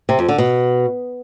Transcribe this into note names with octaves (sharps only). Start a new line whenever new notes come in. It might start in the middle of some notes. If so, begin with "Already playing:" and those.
C3
F2
D3
B2